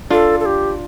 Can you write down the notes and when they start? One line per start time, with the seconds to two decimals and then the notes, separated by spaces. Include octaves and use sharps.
0.11 D4 F4 A4
0.40 A4
0.46 G4